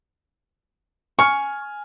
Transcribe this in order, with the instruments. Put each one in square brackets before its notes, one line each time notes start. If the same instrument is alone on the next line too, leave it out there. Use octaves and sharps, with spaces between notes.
[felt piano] G#5 F6 [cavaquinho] C#6